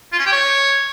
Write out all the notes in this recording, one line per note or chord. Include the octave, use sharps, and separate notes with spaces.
F4
C#4
G4
C#5